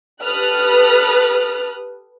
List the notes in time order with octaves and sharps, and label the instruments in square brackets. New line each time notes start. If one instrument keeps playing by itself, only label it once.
[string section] G4 A4 B4 D#6 F6 F#6